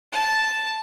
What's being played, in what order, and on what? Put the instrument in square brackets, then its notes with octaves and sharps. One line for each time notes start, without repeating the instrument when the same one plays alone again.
[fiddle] A5